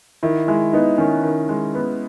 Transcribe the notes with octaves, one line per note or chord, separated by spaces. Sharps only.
D#3 E4
G#3 E4
B3 D#4
D#3 C#4
D#3
G#3
B3